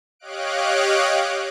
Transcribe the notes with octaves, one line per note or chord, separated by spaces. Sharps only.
G4 C#5 D#5 F5 F#6 D7